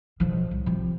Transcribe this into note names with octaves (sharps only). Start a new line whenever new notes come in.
B1 F3
C2
C3 F3